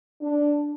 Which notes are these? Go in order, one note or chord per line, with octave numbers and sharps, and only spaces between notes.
D4